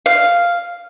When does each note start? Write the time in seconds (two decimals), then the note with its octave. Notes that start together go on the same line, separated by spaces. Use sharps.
0.06 F5